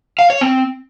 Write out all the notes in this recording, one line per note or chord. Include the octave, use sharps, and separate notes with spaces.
F5
C#5
C4